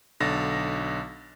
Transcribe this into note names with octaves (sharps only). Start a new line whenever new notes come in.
B1 D3 A6 A#6